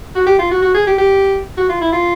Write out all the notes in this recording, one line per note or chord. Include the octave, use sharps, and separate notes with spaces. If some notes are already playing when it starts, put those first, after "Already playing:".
F#4
G4
F4
F#4
F#4
G#4
G4
G4
F#4
F4
E4
F4